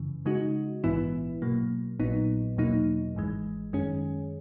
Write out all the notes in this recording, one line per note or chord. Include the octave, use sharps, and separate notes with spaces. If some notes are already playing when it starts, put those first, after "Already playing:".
Already playing: F#2 C#3 E3
C#3 G#3 D#4 F#4
A#1 G#2 E3 B3 E4
B2 F#3 A#3
A#1 A#2 F#3 B3 D#4
E2 B2 F#3 A#3 D#4
G#1 G#2 E3 G#3
F#2 D#3 G#3 C#4 G#4